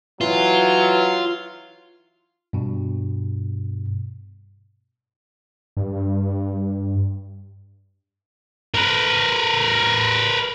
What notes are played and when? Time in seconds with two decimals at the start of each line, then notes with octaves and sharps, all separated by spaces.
0.21 E3 F#3 F4
2.53 G2 B2
5.77 G2
8.74 A#4 B4